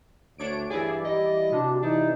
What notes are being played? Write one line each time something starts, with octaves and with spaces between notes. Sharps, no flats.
D2 D4 C#5 D7
G2 E3 E4 G#4 D5
G3 D#5
C3 D4 F#4
E3 D4 D#4